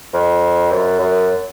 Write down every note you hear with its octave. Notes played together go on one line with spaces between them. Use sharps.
F2
F#2
F#2